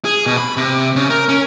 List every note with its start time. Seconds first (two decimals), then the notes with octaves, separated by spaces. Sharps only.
0.05 G#4
0.26 B2
0.38 B5
0.57 C3
0.96 C#3
1.10 A#4
1.29 C#4